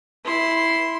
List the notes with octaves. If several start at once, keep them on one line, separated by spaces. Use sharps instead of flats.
E4 C6